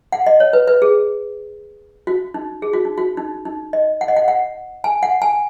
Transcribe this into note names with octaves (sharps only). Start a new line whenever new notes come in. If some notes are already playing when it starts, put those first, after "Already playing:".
F#5
D#5
C#5
B4
B4
G#4
F#4
D#4
G#4
F#4
D#4
F#4
D#4
D#4
D#5
F#5
D#5
F#5
F#5
G#5
F#5
G#5